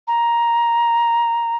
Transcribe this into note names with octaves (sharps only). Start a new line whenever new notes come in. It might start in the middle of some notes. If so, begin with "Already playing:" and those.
A#5